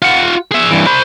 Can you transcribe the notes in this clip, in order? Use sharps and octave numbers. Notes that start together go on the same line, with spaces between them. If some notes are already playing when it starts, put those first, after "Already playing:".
F4 F#5
G#4 E5
G2 E3
C5 B5